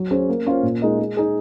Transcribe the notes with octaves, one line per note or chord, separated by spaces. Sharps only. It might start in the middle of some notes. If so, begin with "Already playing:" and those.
Already playing: F#3
C#4 G#4 C5
A#3
C#4 F4 C5
A#2
G#3 D#4 A#4 D#5
G#3
D#4 G#4